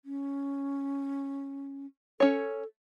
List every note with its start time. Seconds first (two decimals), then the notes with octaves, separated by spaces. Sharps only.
0.05 C#4
2.20 C#4 A4 C#5